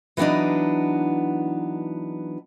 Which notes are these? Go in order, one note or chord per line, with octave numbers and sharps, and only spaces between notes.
E3 F#3 B3 D4 D#4